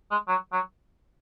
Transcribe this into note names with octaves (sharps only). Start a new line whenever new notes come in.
G#3
F#3
F#3